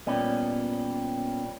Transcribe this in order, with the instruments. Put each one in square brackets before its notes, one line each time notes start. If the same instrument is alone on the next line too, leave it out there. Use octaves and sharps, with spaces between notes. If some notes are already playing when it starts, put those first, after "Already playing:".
[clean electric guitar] A#2 G3 [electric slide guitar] B3 C#4